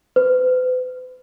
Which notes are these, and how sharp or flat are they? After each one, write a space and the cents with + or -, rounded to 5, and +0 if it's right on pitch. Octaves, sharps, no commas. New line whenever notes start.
B4 +45